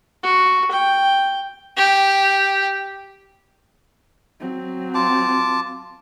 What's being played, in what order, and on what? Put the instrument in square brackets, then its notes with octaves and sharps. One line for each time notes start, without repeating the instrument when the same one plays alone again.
[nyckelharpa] F#4
G5
[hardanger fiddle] G4
[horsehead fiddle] F#3 C4
[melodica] F4 A5 D6